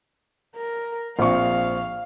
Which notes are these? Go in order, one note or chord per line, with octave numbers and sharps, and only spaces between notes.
A#4
A#1 C4 F5 C#6